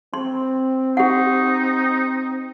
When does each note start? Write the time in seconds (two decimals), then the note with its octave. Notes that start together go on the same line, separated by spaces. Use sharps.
0.14 C4 C6
0.97 D#4 G4 F#5